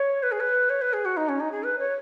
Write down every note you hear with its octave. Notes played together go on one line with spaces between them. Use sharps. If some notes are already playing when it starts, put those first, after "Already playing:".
Already playing: C#5
B4
G#4
B4
C#5
B4
G#4
F#4
D#4
C#4
D#4
G#4
B4
C#5